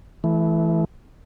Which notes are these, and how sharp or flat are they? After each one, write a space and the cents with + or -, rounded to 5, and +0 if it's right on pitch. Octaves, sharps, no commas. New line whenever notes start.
E3 +0 A3 -30